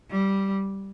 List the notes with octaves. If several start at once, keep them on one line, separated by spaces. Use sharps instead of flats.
G3